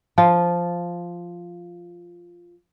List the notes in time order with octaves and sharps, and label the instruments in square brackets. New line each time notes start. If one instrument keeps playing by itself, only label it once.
[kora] F3 F4